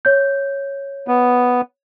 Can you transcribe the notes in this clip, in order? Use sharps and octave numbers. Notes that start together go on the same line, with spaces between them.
C#5 G6
B3